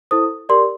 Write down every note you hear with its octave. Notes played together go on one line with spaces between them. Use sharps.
E4 A4 C5 D#6
G4 A#4 D5 C6